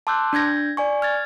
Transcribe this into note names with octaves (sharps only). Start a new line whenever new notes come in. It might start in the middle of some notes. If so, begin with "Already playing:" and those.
A5 C6 D6 E6 F#6 G6
D4 G6 G#6 A#6
D5 G#5 C#6
F6 G#6 A6